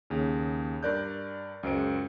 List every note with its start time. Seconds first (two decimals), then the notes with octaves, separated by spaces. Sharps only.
0.10 D#2 C#3
0.83 G2 A#4 D5 F#6 G6
1.63 C#2 F#2 C5 D7